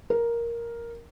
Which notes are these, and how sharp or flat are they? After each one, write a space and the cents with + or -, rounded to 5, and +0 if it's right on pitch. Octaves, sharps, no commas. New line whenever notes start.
A#4 +5